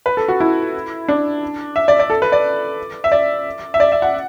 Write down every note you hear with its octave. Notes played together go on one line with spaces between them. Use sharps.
B4
A4
F#4
E4
D4
E5
D5
D5
A4
B4
D5
E5
D5
E5
D5
E5
F#5